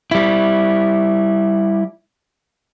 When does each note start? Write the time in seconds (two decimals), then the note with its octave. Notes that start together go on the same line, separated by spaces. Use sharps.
0.11 G3 E4